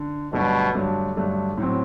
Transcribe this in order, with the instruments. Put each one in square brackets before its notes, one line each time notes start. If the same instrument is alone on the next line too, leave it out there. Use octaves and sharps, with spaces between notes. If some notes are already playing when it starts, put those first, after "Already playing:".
Already playing: [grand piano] D3
[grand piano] G2 D3 F#3 A3 D4 [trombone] B2
[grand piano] G2 D3 F#3 A3 D4
G2 D3 F#3 A3 D4
A2 F#3 C4